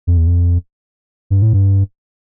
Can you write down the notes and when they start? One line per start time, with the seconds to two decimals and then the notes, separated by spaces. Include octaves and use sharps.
0.07 F2
0.17 E2
0.27 F2
1.30 G2
1.42 A2
1.53 G2